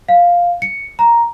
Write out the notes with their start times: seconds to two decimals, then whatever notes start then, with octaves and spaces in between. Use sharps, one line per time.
0.09 F5
0.62 C#7
0.99 A#5